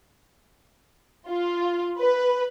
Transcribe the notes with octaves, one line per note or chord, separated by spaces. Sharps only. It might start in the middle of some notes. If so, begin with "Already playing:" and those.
F4
B4